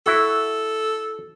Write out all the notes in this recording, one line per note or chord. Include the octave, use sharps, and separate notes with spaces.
E4 F#4 A4